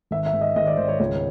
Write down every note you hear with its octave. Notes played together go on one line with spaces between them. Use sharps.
G#1 E5
E5
G#1
D#5
G#1 D#5
D5
G#1 C5
C#5
C#2 C#5